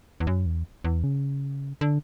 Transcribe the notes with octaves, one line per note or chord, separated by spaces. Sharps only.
E2
F#2
E2
E2
C#3
D3